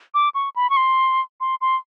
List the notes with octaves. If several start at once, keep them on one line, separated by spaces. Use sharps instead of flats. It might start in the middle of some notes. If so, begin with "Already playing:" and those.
D6
C#6
B5
C#6
C6
C6
C6